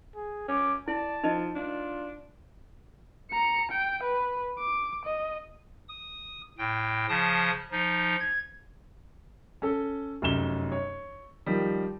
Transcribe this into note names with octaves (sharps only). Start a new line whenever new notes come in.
G#4
C#4 D6
E4 D5 A5
F3 D#4 D#5
D4 F4
A#5 C#7
G5
B4
D6
D#5
D#6
A2 G5
C#3 F3 A5 D#6
F3 D#4
G#6
C#4 A4
F1 F#2 C#4 E7 G7
C#5
D#3 F3 G3